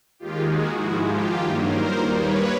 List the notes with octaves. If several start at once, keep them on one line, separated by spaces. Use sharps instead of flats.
D#2 D#3 G#3 F4 G4
F#4 G#4
G#2 F3 G#3 E4 F#4
F4 G4
G2 D#3 F#3 A#3
A#4 C5
D#2 D#3 G3 A#3
B4 C#5